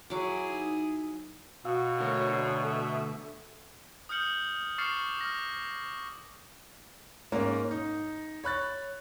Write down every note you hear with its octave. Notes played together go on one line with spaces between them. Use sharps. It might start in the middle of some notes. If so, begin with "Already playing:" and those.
F#3 E4 G#4 D6
D#4
B2 F#4 F5 E6
D3 A3 A#4 C#5
D2 D4 C#5 A#5 E6 C7
A4 E5
D#6 F6 G6 C#7 F#7
C#6 D6 F6 A6 C7 C#7
F6 A#6
G#2 A#3 C#4
D#4
C#5 B5 F#6 A6